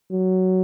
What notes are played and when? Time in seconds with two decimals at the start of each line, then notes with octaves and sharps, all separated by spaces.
0.12 F#3